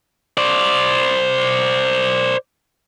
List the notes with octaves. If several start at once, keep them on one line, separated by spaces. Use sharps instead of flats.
C5 D5